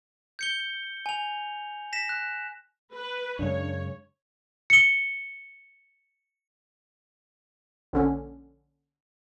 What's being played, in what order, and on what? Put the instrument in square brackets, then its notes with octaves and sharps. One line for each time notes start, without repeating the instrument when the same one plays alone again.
[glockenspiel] G6 C#7 G7
G#5 F7
A#6 B6 E7
F#6
[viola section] B4
[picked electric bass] F#2 C#3 G#3 [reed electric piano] D4 [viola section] C#5
[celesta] C#7 G7
[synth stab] A#1 D3 C#4